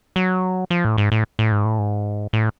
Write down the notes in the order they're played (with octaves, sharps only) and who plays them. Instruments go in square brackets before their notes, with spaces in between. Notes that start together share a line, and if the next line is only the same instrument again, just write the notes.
[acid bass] F#3
F3
A2
G#2
A2
A2
G#2
A2
G#2
A2